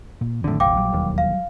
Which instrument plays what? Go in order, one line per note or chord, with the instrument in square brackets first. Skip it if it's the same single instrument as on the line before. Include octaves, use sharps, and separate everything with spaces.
[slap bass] A#2
[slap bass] F2 D#3 F#3 [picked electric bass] A2 D3
[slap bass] D#1 E2 [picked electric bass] A#1 [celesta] F5 G5 D6
[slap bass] F#3 G3
[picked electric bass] E1 D#2
[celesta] F5